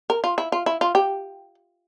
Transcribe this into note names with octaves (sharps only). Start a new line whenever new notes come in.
A#4
F4
E4
F4
E4
F4
G4